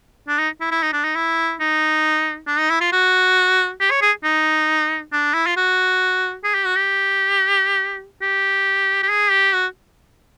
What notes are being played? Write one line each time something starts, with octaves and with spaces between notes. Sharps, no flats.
D4
D#4
E4
E4
D#4
D4
D#4
E4
D#4
D4
D#4
E4
F4
F#4
G4
C#5
G#4
D#4
D4
E4
F4
F#4
G#4
G4
F#4
G4
G4
G4
G#4
G4
F#4